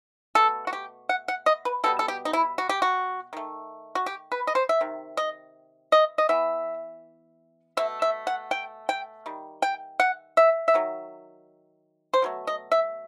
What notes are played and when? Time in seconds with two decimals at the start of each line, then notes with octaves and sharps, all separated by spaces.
0.35 B2 A3 A4
0.67 F#4
0.73 G4
1.09 F#5
1.28 F#5
1.46 D#5
1.65 B4
1.84 B2 G3 B3 A4
1.99 A4
2.08 G4
2.25 D#4
2.33 E4
2.58 F#4
2.69 G4
2.82 F#4
3.33 D#3 A3
3.95 F#4
4.06 G4
4.32 B4
4.47 D#5
4.55 C5
4.69 E5
4.81 C3 D#3
5.17 D#5
5.92 D#5
6.18 D#5
6.29 E3 B3 E5
7.77 B2 A3 E5
8.02 E5
8.27 F#5
8.51 G5
8.89 G5
9.26 D#3 G3
9.62 G5
10.00 F#5
10.37 E5
10.68 E5
10.74 D#3 F#3
12.14 C5
12.22 B2 F#3 A3
12.47 D#5
12.72 E5